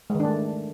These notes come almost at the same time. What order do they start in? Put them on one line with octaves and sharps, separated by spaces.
G#3 D#3 D4 A3